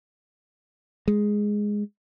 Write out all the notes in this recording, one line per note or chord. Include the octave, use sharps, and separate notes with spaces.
G#3